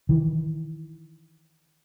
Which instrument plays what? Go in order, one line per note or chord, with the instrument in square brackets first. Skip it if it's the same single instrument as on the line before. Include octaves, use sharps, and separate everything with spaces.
[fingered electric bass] D#3 E3